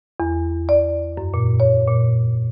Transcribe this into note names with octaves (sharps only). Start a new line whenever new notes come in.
E2
D5
F#2
A#2
C#5
A#2